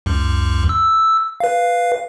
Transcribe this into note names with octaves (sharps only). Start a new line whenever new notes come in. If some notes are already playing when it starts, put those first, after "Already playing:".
C#2 F#2
E6
B4 F5